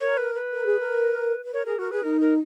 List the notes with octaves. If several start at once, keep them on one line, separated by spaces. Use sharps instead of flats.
A#4 C#5
B4
B4
A#4
G#4
A#4
B4
A#4 C#5
G#4 A#4
F#4 A#4
G#4 B4
D#4 A#4
A#4